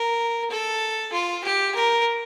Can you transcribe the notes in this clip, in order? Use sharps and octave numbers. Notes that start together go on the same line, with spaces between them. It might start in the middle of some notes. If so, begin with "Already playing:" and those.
Already playing: A#4
A4
F4
G4
A#4